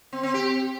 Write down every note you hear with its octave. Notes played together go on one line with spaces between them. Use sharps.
C4
C4
G4